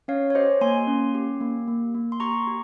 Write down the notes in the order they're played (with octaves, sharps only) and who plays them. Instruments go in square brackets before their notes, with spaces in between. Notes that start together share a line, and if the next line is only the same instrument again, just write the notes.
[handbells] C#4 C#5 F5
C#5
G4 C5 D#5
A#3 G#5 C6
C#4
G4
A#3
A#3
A#3
C6
G4 A#5 C#6
G4